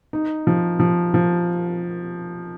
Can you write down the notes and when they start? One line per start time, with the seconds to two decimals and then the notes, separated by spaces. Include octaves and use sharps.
0.13 D#4
0.47 F3
0.80 F3
1.14 F3